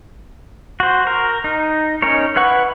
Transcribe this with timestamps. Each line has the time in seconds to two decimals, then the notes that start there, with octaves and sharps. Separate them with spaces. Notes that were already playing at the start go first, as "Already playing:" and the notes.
0.80 F#4 C5
1.07 A#4
1.44 D#4
2.02 C#4 D#4 A#4 C#5
2.36 E4 B4 F#5 C#6